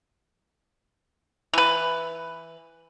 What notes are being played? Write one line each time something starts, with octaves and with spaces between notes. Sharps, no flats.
E3 B4